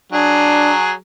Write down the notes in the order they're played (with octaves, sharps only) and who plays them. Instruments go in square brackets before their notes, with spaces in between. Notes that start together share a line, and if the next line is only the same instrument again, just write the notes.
[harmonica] F#3 G#4 [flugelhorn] D4